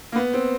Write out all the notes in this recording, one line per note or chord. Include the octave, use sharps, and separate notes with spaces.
A#3
B3
C4